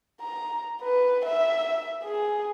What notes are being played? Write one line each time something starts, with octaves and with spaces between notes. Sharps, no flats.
A#5
B4
E5
G#4